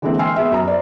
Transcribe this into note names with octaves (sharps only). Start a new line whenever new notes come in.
D3 E3 G#3 A#3 C4
G5 G#5 C6 E6 F6 C7
B3 G#4 E5
F#2 A#5
C5 D5